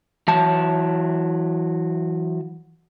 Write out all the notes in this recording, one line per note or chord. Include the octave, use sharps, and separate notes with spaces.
E3 F#3 A5